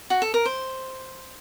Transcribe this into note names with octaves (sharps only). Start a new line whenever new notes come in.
F#4
A4
A#4
C5